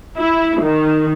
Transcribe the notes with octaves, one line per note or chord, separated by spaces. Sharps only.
E4
D#3